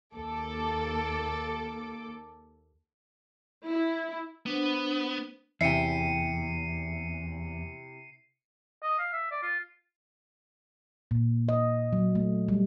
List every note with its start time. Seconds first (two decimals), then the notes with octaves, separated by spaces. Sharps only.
0.14 D#2 A#3 A4 D6
3.67 E4
4.46 B3 D4 C5
5.61 E2 C3 E4 E5 G5 C7 C#7 D#7
8.83 D#5
8.99 F5
9.13 E5
9.31 D5
9.43 F4
11.11 A#2
11.49 D#5
11.93 F#3
12.15 A3
12.48 G3